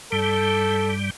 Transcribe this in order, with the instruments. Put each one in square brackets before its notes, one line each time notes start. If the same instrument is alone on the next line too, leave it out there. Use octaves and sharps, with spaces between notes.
[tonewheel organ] G2 G3 [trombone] A4